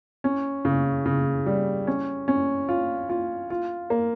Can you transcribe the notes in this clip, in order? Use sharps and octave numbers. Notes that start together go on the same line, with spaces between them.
C#4
C#3
C#3
G3
C#4
C#4
F4
F4
F4
A#3